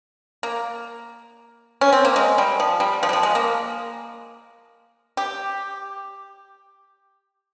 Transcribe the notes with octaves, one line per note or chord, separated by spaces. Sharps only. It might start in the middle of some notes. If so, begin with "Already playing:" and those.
A#3
C#4
C4
A#3
G#3
G3
F3
G3
F3
G3
F3
G#3
A#3
G4